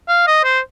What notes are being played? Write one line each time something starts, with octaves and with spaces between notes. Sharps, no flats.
F5
D#5
C5